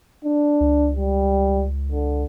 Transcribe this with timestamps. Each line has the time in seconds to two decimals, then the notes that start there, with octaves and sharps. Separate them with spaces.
0.24 D4
0.60 C#2
0.95 G3
1.92 D3